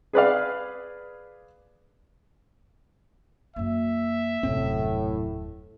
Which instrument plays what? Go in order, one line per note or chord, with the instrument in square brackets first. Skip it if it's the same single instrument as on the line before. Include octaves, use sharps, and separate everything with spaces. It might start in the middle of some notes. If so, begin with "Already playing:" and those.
[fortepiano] G#4 B4 D5 F5
[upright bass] F#2 A#3 [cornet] E5
[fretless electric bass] D#1 F#2 C4 [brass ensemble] A2 [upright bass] C3 F#3